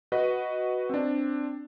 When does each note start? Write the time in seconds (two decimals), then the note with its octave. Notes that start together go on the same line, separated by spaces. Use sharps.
0.12 F#4 B4 D#5
0.89 C4 D4